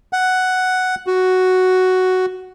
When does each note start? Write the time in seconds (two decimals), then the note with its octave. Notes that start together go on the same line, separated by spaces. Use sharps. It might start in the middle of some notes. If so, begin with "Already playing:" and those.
0.13 F#5
1.07 F#4